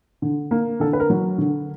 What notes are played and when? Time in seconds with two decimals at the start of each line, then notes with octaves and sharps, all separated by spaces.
0.22 D3
0.51 A#3
0.80 D3 A4
0.93 B4
1.00 A#4
1.10 F#3
1.38 D3